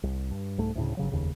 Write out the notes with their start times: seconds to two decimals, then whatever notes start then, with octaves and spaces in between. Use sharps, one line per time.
0.03 C2
0.31 G2
0.58 C2 G#2 A3
0.75 D2 A2 C#3
0.97 G1 C#3 F#3
1.12 F1 D#2 C#3